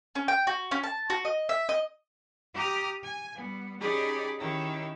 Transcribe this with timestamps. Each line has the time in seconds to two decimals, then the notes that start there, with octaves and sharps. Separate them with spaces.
0.15 C#4
0.28 G5
0.47 F#4
0.71 C#4
0.83 A5
1.10 F#4
1.25 D#5
1.49 E5
1.69 D#5
2.55 G4 A#5 D#6 F6
3.04 G#5
3.36 G3 B3
3.80 C#4 D#4 G4 G#4 D5 B5
4.38 D#3 C#4 D#4 E4 G4